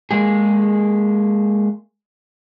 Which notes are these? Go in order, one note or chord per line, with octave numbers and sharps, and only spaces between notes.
G#3 A#3 G#4